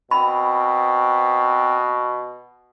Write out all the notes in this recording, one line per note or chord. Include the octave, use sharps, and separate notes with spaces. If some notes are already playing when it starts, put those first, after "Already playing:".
B2 C4 B5